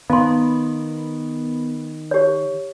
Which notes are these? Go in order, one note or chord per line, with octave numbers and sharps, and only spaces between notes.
D#3 B3 F5 C6
G4 C#5